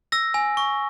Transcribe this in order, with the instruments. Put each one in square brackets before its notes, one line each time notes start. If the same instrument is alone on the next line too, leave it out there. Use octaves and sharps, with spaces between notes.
[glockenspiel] E6 A#6
G#5
C#6